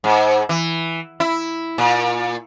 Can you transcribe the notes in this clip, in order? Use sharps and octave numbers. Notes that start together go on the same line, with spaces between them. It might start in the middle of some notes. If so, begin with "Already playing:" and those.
G#2
E3
E4
A#2